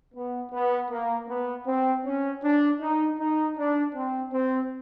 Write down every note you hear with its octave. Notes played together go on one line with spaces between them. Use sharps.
B3
B3
A#3
B3
C4
C#4
D4
D#4
D#4
D4
C4
C4